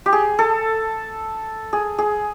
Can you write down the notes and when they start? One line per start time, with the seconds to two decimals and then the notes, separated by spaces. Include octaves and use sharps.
0.06 G4
0.13 G#4
0.39 A4
1.73 G#4
1.98 G#4